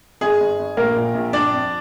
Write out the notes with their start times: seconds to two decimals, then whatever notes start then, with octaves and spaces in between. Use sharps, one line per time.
0.21 G1 G#4
0.40 G1
0.59 G1
0.77 A#1 A#3 A#4
0.96 A#2
1.14 A#1
1.33 G1 D4 D5
1.52 F2